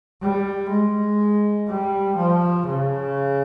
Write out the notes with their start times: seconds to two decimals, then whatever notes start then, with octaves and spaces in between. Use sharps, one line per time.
0.21 G3
0.70 G#3
1.68 G3
2.17 F3
2.67 C#3